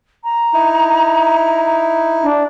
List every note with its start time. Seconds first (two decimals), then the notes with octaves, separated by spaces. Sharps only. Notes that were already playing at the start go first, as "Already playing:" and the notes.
0.24 A#5
0.54 D#4 E4
2.23 D4